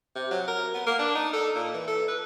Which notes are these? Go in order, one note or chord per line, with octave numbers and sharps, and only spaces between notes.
C3
F#3
A#4
B3
A#3
D4
D#4
A4
A#2
E3
A4
B4